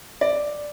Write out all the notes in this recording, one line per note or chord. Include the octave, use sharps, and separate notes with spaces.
D5